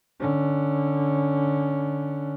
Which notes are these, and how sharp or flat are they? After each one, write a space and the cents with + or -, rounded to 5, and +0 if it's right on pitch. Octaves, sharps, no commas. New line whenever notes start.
D3 +15 C#4 +5